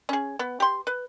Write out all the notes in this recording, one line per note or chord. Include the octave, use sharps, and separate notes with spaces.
C#4 G#4
B3
G4 C6
B4